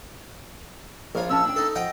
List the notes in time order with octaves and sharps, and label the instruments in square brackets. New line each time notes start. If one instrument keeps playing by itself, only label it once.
[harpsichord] A#1 F4 [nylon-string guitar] A#4 C5 C#5
[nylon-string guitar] C4 C#4 A5 [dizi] E6
[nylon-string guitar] D4 G5
[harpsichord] D#4 A4
[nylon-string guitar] F3 [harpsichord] D#5 F#5 G5